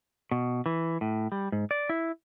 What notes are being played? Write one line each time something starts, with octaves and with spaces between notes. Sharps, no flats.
B2
E3
A2
G3
G#2
D5
E4